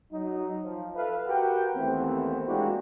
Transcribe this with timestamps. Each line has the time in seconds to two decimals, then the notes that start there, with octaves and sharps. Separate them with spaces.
0.12 F#3 D#4
0.63 F3
0.95 A4 B4 E5 F5
1.27 F#4 G4 A#4 B4 F#5 G5
1.75 D#2 E3 A3 B3 C4
2.46 G#3 A#3 D4 E4 F#4 G4